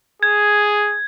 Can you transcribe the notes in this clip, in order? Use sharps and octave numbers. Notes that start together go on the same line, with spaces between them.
G#4 G#6